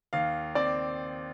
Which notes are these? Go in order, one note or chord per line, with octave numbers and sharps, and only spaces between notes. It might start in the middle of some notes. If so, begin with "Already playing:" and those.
D#2 F5
C4 D5